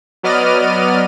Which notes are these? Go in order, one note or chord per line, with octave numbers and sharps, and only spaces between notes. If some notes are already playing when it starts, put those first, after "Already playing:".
F#3 B3 D5 D#5 F6 D#7